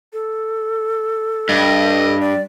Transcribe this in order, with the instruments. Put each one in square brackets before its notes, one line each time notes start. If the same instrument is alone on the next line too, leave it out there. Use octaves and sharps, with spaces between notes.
[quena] A4
[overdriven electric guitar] G2 [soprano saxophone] D#5
[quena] D5